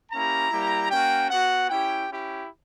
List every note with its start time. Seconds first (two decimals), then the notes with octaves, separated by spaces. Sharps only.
0.12 A#3 C#4 E4 G4 A#5
0.51 G3 A#3 E4 G4
0.91 A#3 C#4 F#4 G5
1.30 B3 F#4 F#5
1.69 C#4 E4 G4 G5
2.09 C#4 E4 G4